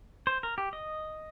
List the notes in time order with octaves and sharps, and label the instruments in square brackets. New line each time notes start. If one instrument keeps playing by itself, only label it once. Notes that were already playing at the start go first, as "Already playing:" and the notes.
[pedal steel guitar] C5
A#4
G4
D#5